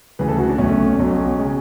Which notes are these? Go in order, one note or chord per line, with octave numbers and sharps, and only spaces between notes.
D2 C#3 E3 B4
A4
F#4
D4
B1 B2 A3 C#4
B1 B2 F#3
C#3 G#3